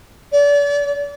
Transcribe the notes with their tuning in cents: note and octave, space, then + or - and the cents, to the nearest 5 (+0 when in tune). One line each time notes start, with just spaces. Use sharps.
D5 -35